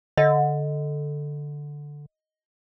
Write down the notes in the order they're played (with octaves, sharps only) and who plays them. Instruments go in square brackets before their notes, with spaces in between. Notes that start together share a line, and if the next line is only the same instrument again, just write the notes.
[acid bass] D3 [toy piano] D#5